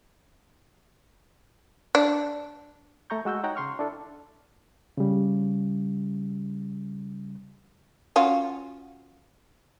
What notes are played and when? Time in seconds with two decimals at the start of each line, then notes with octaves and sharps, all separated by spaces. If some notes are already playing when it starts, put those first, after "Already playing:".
1.95 D4
3.10 A3 A4 A#5 C#6 G6
3.25 G#3 F#4 E6 G6
3.43 D#4 C#5 F#5 G5 A#5
3.56 C#3 C6 C#6 F6
3.79 D4 E4 A4
4.97 C#3 G3
8.16 C#4 F4 F#4